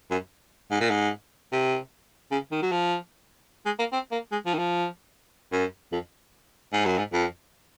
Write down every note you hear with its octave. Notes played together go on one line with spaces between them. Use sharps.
F#2
G#2
A#2
G#2
C3
C#3
D#3
F#3
F3
G#3
A#3
C4
A#3
G#3
F3
D#3
F3
F#2
F2
G#2
F#2
G#2
F2